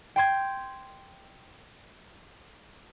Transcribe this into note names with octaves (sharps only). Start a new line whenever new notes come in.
G5 C6 G#6